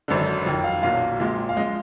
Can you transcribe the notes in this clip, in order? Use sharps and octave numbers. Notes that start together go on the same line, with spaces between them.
G#1 F#2 D3
F2 D#3 F#3
F5
B1 A#2 F#3 F5
A#1 A#2 F3 G#3
F5
F3 G#3 D#5